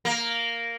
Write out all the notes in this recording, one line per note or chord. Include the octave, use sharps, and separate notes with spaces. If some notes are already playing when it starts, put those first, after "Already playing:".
A#3